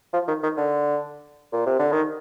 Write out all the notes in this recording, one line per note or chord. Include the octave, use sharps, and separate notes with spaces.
F3
D#3
D#3
D3
A#2
C3
D3
D#3